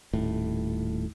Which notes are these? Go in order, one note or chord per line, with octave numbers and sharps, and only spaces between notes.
D#1 A2